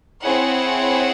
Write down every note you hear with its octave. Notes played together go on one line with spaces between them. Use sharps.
C4 E4 G#4 C#5 F#5